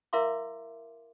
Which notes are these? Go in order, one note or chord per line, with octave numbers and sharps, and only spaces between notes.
E4 A#4 E5 F5 C6 D6